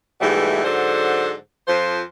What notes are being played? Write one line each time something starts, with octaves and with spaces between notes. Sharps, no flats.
G#2 B2 E3 G3 A3
G#2 D3 F#3 A4 C5
F2 F3 C5